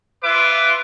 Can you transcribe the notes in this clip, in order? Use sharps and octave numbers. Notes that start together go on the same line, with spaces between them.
F4 B4 E5 D6